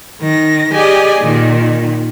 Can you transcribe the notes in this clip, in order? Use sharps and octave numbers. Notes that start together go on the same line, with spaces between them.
D#3 A#6
G4 G#4 D5 D#5 G#5
A#2 D#3